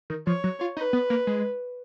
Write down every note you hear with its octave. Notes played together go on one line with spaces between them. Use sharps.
D#3
F3 C#5
F#3
F4
D#4 B4
B3
A#3
G#3